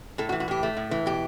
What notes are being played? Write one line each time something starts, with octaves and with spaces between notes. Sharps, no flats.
A2 A4
F#4
E3
F#4
A2 G4
A3
A2
E3
B2 G4